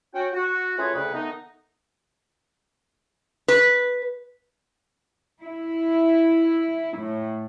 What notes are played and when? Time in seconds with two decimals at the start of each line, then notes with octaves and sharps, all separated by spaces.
0.14 C#4 F#4 G5
0.33 F#4
0.78 A3 C#4 F4 G#4 B4 C#5
0.94 D2 C#3 B4
1.13 D#3 A3 B3 D#4
3.48 B4
5.45 E4
6.99 A2